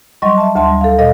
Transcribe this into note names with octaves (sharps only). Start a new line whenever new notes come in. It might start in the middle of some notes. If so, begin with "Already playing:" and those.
F#3 G3 D#5 C6 C#6
E5 A5
D2 E5 A5 C6
G3
A4 F5
A#2 A4 D#5 F5 A#6